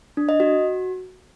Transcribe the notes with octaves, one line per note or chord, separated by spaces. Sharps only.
D4
D#5
F#4